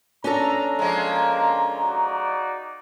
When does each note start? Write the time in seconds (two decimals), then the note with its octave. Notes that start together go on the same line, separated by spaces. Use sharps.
0.24 C#4 D4 A4 A#5
0.79 F3 G#3 A#3 A#5
1.82 D#4 F#4 D5